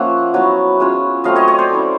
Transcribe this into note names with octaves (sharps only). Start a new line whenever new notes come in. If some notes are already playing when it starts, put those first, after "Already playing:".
Already playing: F3 A#3 C#4 F4 E5 F#5
F#3 B3 E4
G#3 C#4 F4
F#3 A3 C4 D#5 F5
C#5 D#5
C#5 D#5
C5 D5
A3 C#4 E4